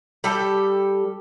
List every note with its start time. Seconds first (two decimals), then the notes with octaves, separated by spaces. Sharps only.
0.24 G3 G4 A4